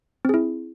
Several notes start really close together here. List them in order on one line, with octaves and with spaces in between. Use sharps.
C4 G#4 E4